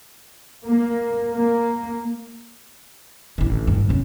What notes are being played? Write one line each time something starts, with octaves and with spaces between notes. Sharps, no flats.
A#3
A#3
A1 D3
G2
C3 C#4